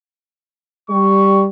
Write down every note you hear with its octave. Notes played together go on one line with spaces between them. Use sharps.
G3 C#6